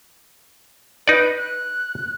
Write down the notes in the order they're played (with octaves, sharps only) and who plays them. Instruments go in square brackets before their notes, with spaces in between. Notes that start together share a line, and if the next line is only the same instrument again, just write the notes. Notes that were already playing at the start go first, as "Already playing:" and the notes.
[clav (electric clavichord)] D#4 D5 [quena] B4
[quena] F#6